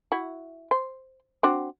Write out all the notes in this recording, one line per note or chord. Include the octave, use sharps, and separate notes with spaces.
E4 F#4
C5
C4 D4 F#4